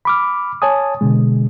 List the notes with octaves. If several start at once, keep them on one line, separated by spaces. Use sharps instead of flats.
B5 D6 F6
C#5 G#5 A5 D#6
B2 D3 G#3